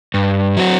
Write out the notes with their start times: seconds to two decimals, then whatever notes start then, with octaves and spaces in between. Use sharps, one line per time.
0.14 G2
0.57 F#3 C4 F#4